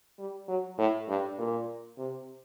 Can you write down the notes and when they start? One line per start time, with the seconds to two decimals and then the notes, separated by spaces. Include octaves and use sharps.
0.19 G3
0.48 F#3
0.78 A2
1.08 G2
1.38 A#2
1.98 C3